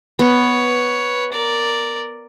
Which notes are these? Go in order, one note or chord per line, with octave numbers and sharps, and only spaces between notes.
B3 B4 C#5
A#4 D5